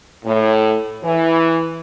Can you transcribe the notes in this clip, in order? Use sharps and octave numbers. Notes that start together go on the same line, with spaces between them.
A2
E3